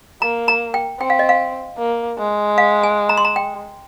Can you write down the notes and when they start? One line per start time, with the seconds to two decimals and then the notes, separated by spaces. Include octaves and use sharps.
0.22 A#3 A#5
0.48 A#5
0.74 G5
1.00 C4 G5
1.10 F5
1.19 D#5
1.29 F5
1.79 A#3
2.18 G#3
2.58 F5
2.83 G#5
3.09 A#5
3.17 C6
3.25 A#5
3.36 G5